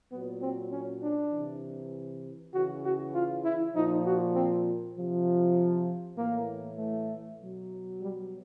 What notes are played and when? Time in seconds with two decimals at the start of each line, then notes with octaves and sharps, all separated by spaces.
0.12 A#2 F#3 B3
0.42 C4
0.72 C#4
1.03 D4
1.33 C3 E3
2.54 C#3 E3 F#4
2.85 F#4
3.15 F4
3.45 E4
3.75 A#2 F3 D#4
4.06 F#4
4.36 C4
4.96 C3 F3
6.18 A2 E3 A#3
6.79 A3
7.39 B2 F#3
7.99 G3